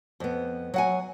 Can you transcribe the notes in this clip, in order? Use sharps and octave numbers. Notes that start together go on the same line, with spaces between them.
F2 B3
F#3 F#5 G#5